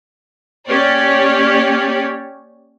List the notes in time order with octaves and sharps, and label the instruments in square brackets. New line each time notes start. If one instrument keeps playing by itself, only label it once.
[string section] A#3 C#4 G4 C#5 D5